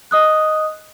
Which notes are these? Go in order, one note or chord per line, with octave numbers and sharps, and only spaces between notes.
D#5 D#6 F#6